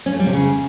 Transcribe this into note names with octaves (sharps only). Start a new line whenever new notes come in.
C#4
A3
G3
C3
C#3